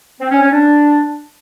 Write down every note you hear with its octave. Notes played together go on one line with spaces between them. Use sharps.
C4
C#4
C#4
D4